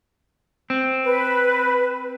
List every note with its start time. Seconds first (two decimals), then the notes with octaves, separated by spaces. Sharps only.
0.70 C4
1.04 B4